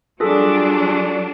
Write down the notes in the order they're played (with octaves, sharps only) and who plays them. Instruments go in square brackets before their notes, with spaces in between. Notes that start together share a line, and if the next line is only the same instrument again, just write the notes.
[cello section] F#3 G3 D4 [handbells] F4 G#4 A4